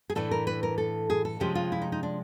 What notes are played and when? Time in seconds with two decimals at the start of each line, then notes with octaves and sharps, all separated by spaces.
0.10 G#4
0.15 A2 E3 A3 D4 A4
0.31 A#4
0.47 B4
0.63 A#4
0.78 A4
1.10 G#4
1.25 A4
1.40 C3 F3 G#3 C#4 G4
1.55 F4
1.72 E4
1.82 D#4
1.92 D#4
2.03 D4